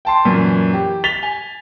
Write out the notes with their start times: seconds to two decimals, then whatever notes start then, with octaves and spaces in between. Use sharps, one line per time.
0.05 G5 A5 C6
0.25 F#2 A#2 E3
0.73 G4
1.04 A6 B6 F7 G7
1.23 G#5